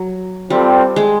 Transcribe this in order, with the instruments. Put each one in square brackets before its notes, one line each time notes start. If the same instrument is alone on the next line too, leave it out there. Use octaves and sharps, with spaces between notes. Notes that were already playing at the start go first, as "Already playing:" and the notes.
Already playing: [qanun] F#3
[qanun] G3 [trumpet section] C4 F4 A4 D5 G5
[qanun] G#3